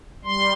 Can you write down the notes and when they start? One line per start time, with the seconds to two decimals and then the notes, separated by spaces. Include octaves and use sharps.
0.25 G3 C6